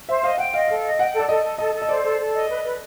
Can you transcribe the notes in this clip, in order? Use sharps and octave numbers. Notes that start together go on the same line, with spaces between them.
C5 E5
D#5 F5
F#5 G5
D#5 F5
A4 F5
D#5
F#5 G5
A4
D5
A4 D#5
A4
A4 D#5
A4
D#5
C5 D5
A4
A4
D#5
B4
B4